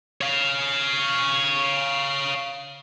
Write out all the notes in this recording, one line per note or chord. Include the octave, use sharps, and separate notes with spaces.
C#5 F5